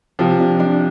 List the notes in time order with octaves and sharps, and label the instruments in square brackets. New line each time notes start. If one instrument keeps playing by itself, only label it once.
[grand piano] C3 F3 [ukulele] F4
[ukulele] D4
D4